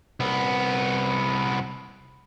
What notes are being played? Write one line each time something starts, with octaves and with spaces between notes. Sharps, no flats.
C2 B3